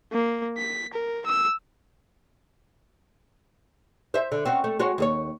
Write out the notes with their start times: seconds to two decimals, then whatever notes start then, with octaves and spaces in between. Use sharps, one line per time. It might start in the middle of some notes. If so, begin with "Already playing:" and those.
0.13 A#3
0.58 B6
0.93 A#4
1.26 E6
4.14 C5 E5
4.32 D3
4.45 C4 C#4 F#4
4.64 A3
4.79 G#3 F#4 C#5
4.98 D#2 G#4 C#5